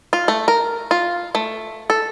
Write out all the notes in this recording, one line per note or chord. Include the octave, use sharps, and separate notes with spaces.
F4
A3
A#4
F4
A3
A4